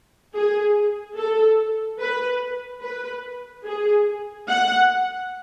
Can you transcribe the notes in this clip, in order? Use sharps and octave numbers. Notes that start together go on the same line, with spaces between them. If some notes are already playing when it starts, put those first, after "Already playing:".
G#4
A4
B4
B4
G#4
F#5